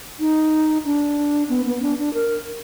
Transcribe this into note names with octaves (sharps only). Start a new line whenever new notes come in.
D#4
D4
B3
B3
D4
D4
A#4